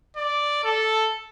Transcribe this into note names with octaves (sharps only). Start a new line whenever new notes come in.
D5
A4